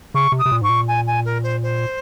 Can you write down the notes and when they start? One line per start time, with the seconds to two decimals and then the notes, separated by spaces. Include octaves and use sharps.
0.14 C#3 C#6
0.32 C3
0.39 D#6
0.46 C3
0.52 A#2
0.61 G#2 C#6
0.69 A#2
0.87 G#5
1.07 G#5
1.25 A#4
1.43 C5
1.62 C5